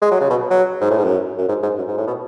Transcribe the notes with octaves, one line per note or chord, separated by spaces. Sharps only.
G#3
F#3
C#3
B2
F#3
G#2
A2
G#2
F#2
F#2
G#2
G#2
F#2
G#2
A2
B2